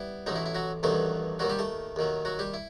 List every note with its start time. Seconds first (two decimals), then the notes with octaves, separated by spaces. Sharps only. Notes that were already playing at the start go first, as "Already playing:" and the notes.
Already playing: G3 B3 E4
0.26 A1 A2 F#3 D#4
0.36 E4
0.46 E4
0.55 F#3 F#4
0.83 A1 G2 D#3 F#3 A3 B3 A4
1.39 D#2 D#3 F#3 G3 F#4
1.50 G3 G4
1.59 A3 A4
1.96 D#2 D#3 F#3
2.25 F#3 F#4
2.39 G3 G4
2.54 E4